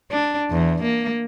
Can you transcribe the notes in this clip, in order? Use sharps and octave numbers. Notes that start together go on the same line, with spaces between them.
D4
E2
A#3